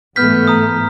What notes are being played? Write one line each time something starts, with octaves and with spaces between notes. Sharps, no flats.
G#2 E3 A3 B3 F6 G6 B6
A#5 D#6